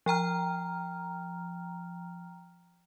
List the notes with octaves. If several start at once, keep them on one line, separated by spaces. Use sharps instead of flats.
F3 G5 A#5 F6